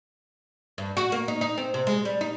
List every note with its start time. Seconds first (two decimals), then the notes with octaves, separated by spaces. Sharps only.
0.78 G2
0.97 F#4
1.12 A#3
1.28 D#4
1.41 D#4
1.58 C4
1.74 C3
1.87 G#3
2.05 G3
2.21 D#4